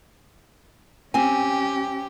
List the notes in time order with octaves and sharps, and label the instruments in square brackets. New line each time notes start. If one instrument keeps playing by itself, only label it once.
[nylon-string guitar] C4 G#5 [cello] C#4 G4